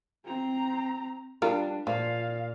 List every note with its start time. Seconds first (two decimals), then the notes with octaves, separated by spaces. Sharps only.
0.25 C4 A#5
1.42 G3 D4 F4 A#4
1.87 A#2 F3 F5